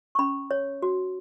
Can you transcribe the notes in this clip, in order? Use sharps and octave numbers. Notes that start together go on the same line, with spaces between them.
C#6
C#4 B5
C#5
F#4